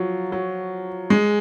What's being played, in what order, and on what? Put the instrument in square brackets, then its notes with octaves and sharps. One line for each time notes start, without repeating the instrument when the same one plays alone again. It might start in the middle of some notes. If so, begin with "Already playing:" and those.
Already playing: [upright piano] F3 F#3
F#3
G#3